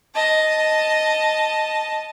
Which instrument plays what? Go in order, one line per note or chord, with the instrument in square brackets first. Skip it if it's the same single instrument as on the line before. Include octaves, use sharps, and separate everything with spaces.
[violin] D#5 A5